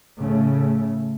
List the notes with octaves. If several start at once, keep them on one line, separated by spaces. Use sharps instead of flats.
A2 C#3 A3